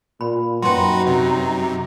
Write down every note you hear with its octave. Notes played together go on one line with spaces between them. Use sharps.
A#2 B5
F#2 F#3 D#4 F#4 B4 G5 B5 C6
C3